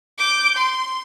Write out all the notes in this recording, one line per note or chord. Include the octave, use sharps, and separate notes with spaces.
D6 G6
C6